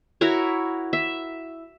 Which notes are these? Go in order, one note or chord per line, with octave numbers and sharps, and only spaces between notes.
E4 F#4 A#4 C#5
E5